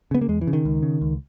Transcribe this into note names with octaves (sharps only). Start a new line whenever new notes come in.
C#3 B3
A#3
E2 G#3
E3
C#3
D#3
C#2
C#3
C#2